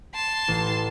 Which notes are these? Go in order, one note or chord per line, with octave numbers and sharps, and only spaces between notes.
A5 C6
A1